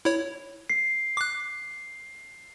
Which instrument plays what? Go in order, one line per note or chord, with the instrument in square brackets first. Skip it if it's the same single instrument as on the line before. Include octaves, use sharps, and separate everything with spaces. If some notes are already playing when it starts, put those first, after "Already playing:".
[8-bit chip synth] E4 C#5
[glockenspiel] C7
[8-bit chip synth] D6 F#6